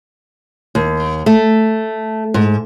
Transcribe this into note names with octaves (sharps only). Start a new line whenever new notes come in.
D#2
A3
G#2